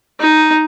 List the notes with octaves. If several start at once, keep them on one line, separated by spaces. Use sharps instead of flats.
D#4